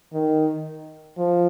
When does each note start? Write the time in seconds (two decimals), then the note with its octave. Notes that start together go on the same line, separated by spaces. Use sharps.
0.13 D#3
1.17 F3